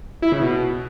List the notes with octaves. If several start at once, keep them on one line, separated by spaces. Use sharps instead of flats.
E4
C#3
B2